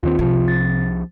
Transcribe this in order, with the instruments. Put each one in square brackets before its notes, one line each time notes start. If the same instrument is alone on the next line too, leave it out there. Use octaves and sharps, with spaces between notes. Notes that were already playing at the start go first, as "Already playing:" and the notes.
[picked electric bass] D#2 D#3 C4 [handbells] F4
[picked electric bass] C2 F3 [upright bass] C3
[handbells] A6